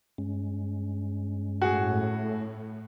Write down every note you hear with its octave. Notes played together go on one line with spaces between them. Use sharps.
G2 G#3 C#4
A2 F#4 G#4